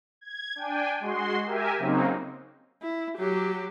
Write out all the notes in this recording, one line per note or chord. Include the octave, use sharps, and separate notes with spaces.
G#6
D4 G5 G#5
G#3 F#4 C6
G4 A#4 E5 G#5
C#3 F#3 A#3 C4 D#4
E4
F#3 G4